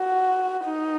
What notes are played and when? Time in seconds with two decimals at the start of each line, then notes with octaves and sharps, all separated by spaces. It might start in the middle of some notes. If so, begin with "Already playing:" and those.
Already playing: F#4
0.64 D#4